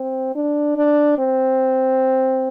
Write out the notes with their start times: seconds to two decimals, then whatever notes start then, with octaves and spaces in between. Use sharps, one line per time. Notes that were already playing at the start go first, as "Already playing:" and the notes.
Already playing: C4
0.35 D4
0.76 D4
1.18 C4